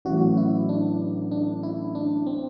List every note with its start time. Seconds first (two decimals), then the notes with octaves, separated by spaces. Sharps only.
0.05 A1 A2 F#3 F#4
0.37 E4
0.69 D4
1.31 D4
1.63 E4
1.95 D4
2.27 C4